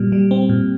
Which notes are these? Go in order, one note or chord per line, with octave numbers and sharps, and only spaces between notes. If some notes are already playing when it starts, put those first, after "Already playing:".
Already playing: A#2 G3
G3
C4
A#2